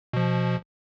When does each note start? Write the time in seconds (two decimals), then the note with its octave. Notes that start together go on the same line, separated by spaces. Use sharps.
0.13 B2 F3